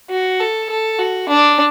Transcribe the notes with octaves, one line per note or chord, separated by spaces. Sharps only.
F#4
A4
A4
F#4
D4